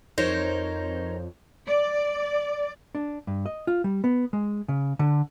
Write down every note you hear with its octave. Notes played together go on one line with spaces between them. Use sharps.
F2 D#4 A#4 C5 C#5
D5
D4
G2
D#5
F4
G3
B3
G#3
C#3
D3